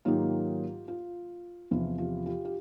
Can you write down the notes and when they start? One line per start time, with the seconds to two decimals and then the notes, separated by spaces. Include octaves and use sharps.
0.05 G#2 D#3 F#3 A#3 D#4 F4 G4
0.88 F4
1.71 E2 C3 F3 F4
1.98 F4 G4
2.26 F4 G4
2.45 G4